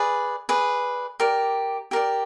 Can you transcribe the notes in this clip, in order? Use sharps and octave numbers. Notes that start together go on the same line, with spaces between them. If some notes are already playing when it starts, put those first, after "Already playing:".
Already playing: G#4 B4 D5
G#4 B4 D5
G4 A#4 D5
G4 A#4 D5